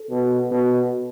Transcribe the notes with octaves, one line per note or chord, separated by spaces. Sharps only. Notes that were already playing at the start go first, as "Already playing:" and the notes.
Already playing: A4
B2
B2